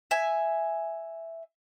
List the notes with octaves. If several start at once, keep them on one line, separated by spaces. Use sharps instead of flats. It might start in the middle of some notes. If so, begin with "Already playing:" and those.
E5 G#5